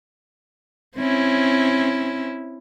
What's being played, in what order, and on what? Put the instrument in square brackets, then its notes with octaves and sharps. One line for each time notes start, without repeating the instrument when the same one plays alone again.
[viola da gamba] C4 C#4 E4